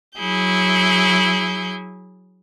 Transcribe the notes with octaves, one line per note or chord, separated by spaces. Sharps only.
F#3 E4 G#4 G6